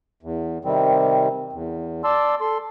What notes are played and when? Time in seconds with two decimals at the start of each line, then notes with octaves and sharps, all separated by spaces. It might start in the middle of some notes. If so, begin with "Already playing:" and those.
0.23 E2
0.65 C3 D#3 G3 C4
1.52 E2
2.04 D5 A5 C6 E6
2.41 A4 C6